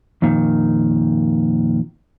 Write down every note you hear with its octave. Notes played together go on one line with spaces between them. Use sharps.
F2 A#2 D#3